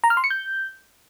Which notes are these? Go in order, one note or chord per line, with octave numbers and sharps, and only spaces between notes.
A#5
F6
C6
C#7
G6